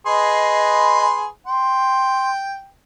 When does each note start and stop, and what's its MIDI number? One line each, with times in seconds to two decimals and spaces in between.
0.06 1.27 68
0.06 1.27 71
0.06 1.06 75
0.06 1.27 84
1.46 2.67 79
1.46 2.30 84